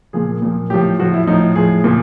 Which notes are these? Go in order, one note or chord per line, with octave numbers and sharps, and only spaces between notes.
A#2 F3 G#4
A#2 F3
A2 F3 G4
A2 F3 F#4
E4
A2 F3 D#4
A2 F3 G#4
A#2 F3